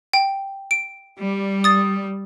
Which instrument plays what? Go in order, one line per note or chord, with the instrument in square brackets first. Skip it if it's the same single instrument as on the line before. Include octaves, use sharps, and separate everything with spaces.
[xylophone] G5
D7
[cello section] G3
[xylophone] D#6 A6